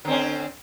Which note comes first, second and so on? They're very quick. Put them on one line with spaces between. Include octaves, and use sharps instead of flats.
D3 C4 C#4